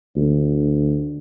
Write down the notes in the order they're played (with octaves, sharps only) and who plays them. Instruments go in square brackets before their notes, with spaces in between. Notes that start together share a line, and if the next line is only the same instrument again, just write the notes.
[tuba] D2